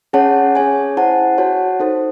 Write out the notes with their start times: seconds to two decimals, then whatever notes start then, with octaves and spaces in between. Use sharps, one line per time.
0.13 C#4 G#4 C#5 F#5 A5
0.55 C#4 G#4 C#5 G#5
0.97 E4 C5 F#5 A5
1.38 F#4 C#5 F#5 A5
1.80 D#4 A4 C5